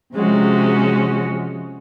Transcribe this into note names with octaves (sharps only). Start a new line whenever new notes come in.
C3 F3 G#3 C#4 F#4